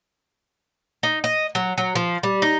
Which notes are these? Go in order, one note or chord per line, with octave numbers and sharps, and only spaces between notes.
D#4
D#5
F#3
F#3
F3
G3
D#4